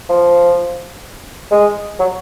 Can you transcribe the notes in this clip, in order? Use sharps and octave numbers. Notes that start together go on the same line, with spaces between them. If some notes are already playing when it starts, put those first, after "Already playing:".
F3
G#3
F#3